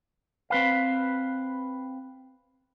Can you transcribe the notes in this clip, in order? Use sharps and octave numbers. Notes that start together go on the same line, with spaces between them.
C4 B4 F5